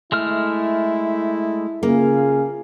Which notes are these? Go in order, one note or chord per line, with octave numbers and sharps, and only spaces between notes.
G#3 A3 E4 F6
C#3 A#3 F4 G#4